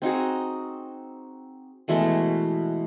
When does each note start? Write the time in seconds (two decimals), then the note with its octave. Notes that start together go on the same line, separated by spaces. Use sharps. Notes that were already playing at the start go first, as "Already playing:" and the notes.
0.02 C4 D#4 F#4 G#4
1.88 B2 E3 G#3 A3